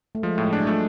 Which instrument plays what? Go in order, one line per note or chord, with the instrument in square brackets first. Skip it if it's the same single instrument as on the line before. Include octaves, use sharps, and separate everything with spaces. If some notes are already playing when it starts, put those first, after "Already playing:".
[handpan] A3
[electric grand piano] F3 [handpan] G#3
[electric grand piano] A2
[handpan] G#3
[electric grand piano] D4
[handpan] F#3
[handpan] F3 [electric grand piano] A3